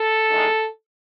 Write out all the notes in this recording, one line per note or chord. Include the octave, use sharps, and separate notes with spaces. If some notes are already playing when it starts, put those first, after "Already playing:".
Already playing: A4
E2 D#3 G#3 D#4